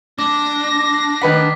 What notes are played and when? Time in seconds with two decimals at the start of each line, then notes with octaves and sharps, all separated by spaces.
0.19 D4 D6 A#6
1.22 D#3 B4 F#5 B6